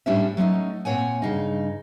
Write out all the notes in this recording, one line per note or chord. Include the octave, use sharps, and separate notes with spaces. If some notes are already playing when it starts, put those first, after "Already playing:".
A2 G3 C#4 D4 E4 E5
F#3 A3 C#4 D#4
A#2 C4 C#5 F#5 G#5
G2 C#3 D#4